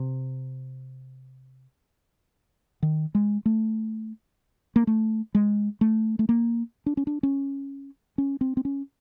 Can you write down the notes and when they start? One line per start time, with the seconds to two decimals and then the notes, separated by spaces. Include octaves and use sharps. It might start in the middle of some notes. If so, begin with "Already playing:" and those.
Already playing: C3
2.83 D#3
3.15 G#3
3.46 A3
4.76 A#3
4.87 A3
5.35 G#3
5.81 A3
6.19 A3
6.29 A#3
6.86 D4
6.97 C#4
7.07 D4
7.23 C#4
8.18 C#4
8.41 C4
8.57 C4
8.65 C#4